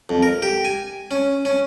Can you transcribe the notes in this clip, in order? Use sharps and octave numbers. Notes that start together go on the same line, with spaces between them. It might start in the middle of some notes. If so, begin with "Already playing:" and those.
F2
A#4
G4
G#5
C#4
C#4